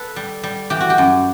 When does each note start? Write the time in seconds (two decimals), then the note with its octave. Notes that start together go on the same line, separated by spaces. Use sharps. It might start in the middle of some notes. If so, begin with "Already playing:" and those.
Already playing: A4 B4
0.16 G3
0.44 G3
0.70 E3 G4
0.80 F#4
0.90 G4
0.98 F#2